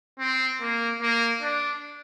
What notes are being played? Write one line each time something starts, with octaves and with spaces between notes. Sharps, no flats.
C4
A#3
A#3
D4